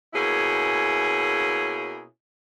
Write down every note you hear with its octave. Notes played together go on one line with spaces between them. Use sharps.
B2 A#3 C#4 E4 G#4